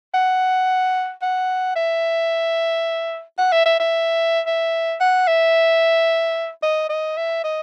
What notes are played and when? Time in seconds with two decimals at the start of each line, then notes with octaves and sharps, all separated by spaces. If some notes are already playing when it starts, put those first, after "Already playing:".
0.14 F#5
1.22 F#5
1.76 E5
3.38 F#5
3.52 E5
3.65 E5
3.80 E5
4.47 E5
5.00 F#5
5.28 E5
6.63 D#5
6.89 D#5
7.17 E5
7.44 D#5